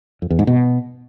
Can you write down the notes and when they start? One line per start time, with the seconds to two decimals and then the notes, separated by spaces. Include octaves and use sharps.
0.22 F2
0.30 E2
0.39 G#2
0.47 B2